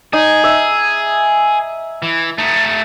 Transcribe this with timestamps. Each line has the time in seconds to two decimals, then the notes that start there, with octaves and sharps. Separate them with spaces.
0.13 D#4 G#4
0.44 E5
2.02 E3
2.38 A3 D#4